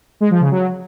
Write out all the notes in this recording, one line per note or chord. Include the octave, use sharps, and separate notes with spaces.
G#3
F3
C#3
F#3